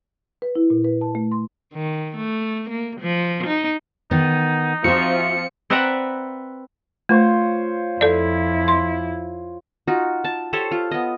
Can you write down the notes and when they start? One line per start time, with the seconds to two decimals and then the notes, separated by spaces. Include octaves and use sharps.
0.42 B4
0.55 E4
0.70 A#2
0.85 B4
1.01 A5
1.15 A3
1.32 C6
1.73 D#3
2.16 A3
2.70 A#3
3.01 F3
3.47 D#4
4.11 D#3 B3 D#4
4.84 F3 C4 F4 F#4 E5 C#7
5.70 C4 B4 D5 E5 F#5 A#5
7.09 A3 F4 C5 C#5
8.01 F2 E4 A4 D5
8.68 C6
9.88 D#4 F4 F#4
10.24 A5
10.53 G4 A4 C5 C#5
10.71 F4
10.91 B3 D#5